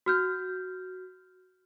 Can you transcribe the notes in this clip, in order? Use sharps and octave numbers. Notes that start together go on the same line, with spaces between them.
F#4 F6 G6